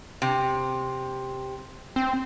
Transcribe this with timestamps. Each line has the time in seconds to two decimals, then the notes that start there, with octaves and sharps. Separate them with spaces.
0.22 C3
1.96 C4